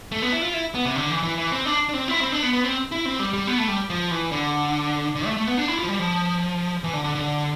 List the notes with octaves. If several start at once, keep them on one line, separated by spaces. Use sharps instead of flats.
A3
B3
E4
F4
E4
B3
C3
D3
E3
E3
E3
C4
D4
D4
C4
E4
C4
D4
B3
B3
C4
E4
C4
G3
G3
B3
A3
G3
F3
E3
D3
D3
A3
A3
B3
D4
E4
F4
F3
G3
F3
E3
D3
D3
D3